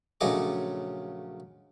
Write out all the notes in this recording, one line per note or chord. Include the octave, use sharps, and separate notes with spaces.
A#1 C#3 F#3 A3 D#5 D6